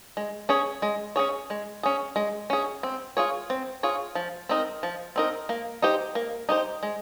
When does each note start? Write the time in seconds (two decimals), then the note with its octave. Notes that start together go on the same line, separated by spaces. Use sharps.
0.17 G#3
0.49 C#4 G#4 C#5
0.82 G#3
1.16 C#4 G#4 C#5
1.50 G#3
1.83 C#4 G#4
2.16 G#3
2.50 C#4 G#4
2.83 C4
3.17 F4 G#4 C#5
3.50 C4
3.83 F4 G#4 C#5
4.15 F3
4.49 C4 D#4 A#4
4.83 F3
5.16 C4 D#4 A#4
5.49 A#3
5.82 D#4 G4 C5
6.15 A#3
6.49 D#4 G4 C5
6.83 G#3